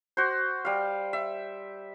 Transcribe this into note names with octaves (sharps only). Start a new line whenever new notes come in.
F#4 C5
G3 F5
E5